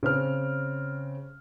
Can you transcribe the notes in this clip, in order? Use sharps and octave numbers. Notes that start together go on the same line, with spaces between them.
C#3 C4 F6